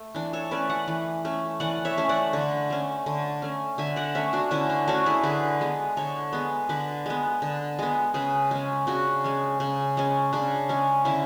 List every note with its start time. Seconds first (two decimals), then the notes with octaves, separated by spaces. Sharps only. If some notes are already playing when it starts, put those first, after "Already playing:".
Already playing: A3
0.15 E3 D4
0.33 A4 C#5
0.51 A3 C#4 B4 D5
0.70 D5 F#5
0.88 E3
1.25 A3 C#4
1.60 E3 D5 F#5
1.85 C#5 E5
1.98 A3 C#4
2.09 D5 F#5
2.33 D3
2.70 A3 C#4
3.06 D3
3.42 A3 C#4
3.78 D3 E5 G#5
3.96 D5 F#5
4.15 A3 C#4 C#5 E5
4.33 D4 F#4
4.51 D3 C#4 E4
4.70 D4
4.87 A3 C#4 D4 F#4
5.06 E4 G#4
5.23 D3 G#4 B4
5.61 G#3 B3
5.97 D3 A4 C#5
6.33 G#3 B3
6.69 D3 B4 D5
7.06 G#3 B3
7.42 D3
7.79 G#3 B3
8.14 C#3 G#4 B4
8.51 G#3 C#4
8.87 C#3 D4 F#4
9.24 G#3 C#4
9.60 C#3
9.97 G#3 C#4
10.33 C#3 D4
10.69 G#3 C#4
11.05 D3 C#4 E4